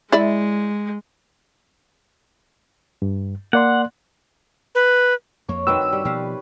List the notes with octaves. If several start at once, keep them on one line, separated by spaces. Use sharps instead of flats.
G#3 E4 D5 E5
G2
A#3 D5 F#5 C6
B4
F2 A#3 C#5
D#3 C4 F#4 B4 G5 E6
G2
G3
B2 F3 G3 F5